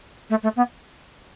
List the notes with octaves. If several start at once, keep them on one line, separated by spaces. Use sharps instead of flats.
A3
A3
B3